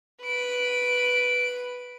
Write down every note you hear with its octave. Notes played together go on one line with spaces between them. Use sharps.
B4 D7